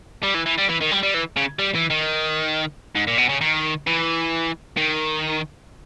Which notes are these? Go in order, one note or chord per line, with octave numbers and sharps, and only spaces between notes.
G3
E3
E3
G3
E3
D#3
G3
G3
E3
C#3
G3
E3
D#3
G#2
A#2
B2
C#3
D#3
E3
D#3